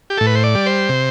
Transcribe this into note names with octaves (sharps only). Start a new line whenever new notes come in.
G4
A2 A4
B4
C5
D5
G3
C5
C3